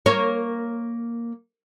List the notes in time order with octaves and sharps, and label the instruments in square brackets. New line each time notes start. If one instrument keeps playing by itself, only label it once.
[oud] A#3 C#5